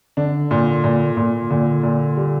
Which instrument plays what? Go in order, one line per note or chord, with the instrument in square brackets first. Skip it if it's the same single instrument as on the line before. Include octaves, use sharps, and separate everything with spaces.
[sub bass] D3 [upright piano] D4
[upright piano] A#2
A#2
A#2
[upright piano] A#2 [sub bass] D3
[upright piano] A#2
G3